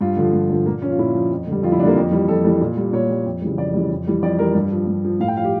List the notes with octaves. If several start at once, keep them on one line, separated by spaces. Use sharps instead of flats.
G2 F4
D3 F3
G2
D3 F3
A#2 A#3
F3 C#4
F4
A#2 E4
F3
F2
D3
G3
F2 F4
E4
D3 G3 A#3 D4
F2
E3 G3
F2 A4
E3 G3
A#2
G3
A#2 C#5
G3
F2
C#3 E3 G3
F2 D5
C#3 E3 G3
F2
E3 G3
F2 D5
E3 G3 A#4
G2
F3
G2
F3
A2 F5
G5
F3 F5
G4